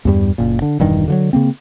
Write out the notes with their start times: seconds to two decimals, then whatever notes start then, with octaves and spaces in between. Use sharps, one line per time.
0.05 E2 G2 G3
0.38 F#1 A#2
0.62 D3
0.80 E1 G2 D#3
1.08 D3 F3 F#3
1.33 C#3 A#3 C4